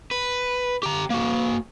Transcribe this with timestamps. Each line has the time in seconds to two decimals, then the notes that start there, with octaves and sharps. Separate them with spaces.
0.11 B4
0.83 G4 A#5
1.10 A#3 F#4